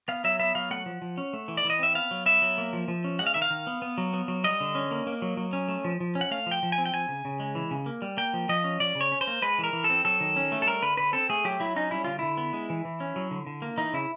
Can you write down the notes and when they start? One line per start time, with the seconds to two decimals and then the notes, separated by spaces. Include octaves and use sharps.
0.08 B3 F5
0.24 F#3 E5
0.39 B3 E5
0.55 F#3 F5
0.71 A3 F#5
0.86 F3
1.02 F3
1.18 C#4
1.33 A3
1.48 E3
1.57 D5
1.65 E3
1.70 D#5
1.79 C4 E5
1.95 B3 F5
2.11 F#3
2.26 B3 E5
2.42 F#3
2.58 A#3
2.73 F3
2.88 F3
3.04 C#4
3.19 G#3 F#5
3.27 F5
3.34 D#3 E5
3.42 F5
3.50 D#3
3.67 B3
3.82 B3
3.98 F#3
4.13 B3
4.28 F#3
4.44 G3 D#5
4.60 D3
4.75 C#4
4.91 A#3
5.07 A#3
5.22 F#3
5.37 F#3
5.53 C#4
5.68 A3
5.85 F3
6.00 F3
6.15 C#4
6.21 F#5
6.31 A3 F5
6.46 F3
6.51 G5
6.63 F3
6.72 G#5
6.78 C4
6.85 G5
6.93 F3 G#5
7.08 C#3
7.25 C#3
7.40 G#3
7.55 E3
7.71 C#3
7.86 A#3
8.02 G3
8.17 A#3 G5
8.34 F3
8.49 F3 D#5
8.64 C#4
8.80 F3 D5
8.95 C#3
9.01 C#5
9.12 C#4
9.21 C5
9.27 A#3
9.42 G#3 B4
9.59 E3
9.64 A#4
9.73 E3
9.84 A4
9.90 C4
10.05 F#3 A4
10.20 D#3
10.36 C#4
10.52 A3
10.62 A4
10.66 G3 A#4
10.82 D3 B4
10.97 D3 B4
11.13 C4 A4
11.30 A3 G#4
11.45 F#3 G4
11.60 F#3 E4
11.76 C#4 D#4
11.91 G3 E4
12.04 D3 F4
12.19 D3 E4
12.37 B3
12.53 G#3
12.70 E3
12.85 E3
13.00 C#4
13.16 F#3
13.31 D3
13.46 D3
13.62 A#3
13.78 E3 D#4
13.93 C#3 E4